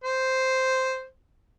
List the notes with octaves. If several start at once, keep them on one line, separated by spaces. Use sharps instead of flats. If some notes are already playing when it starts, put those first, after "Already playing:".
C5